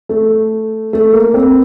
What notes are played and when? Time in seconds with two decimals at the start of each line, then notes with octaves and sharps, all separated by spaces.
0.09 A3
0.93 A3
1.13 A#3
1.34 C4